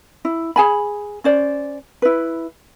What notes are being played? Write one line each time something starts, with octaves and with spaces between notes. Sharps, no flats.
E4
G#4 G#5 B5
C#4 C5 D5
E4 B4